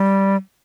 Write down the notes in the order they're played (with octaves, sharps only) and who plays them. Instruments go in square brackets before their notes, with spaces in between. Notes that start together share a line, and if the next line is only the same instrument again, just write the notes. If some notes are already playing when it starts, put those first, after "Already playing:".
Already playing: [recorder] G3